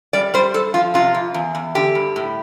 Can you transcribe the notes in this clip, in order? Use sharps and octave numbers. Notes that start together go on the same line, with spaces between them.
G3 D5
G3 C5
G2 A4
F3 F4
C3 F4
F2
E2
E2
D3 G4
G2
A2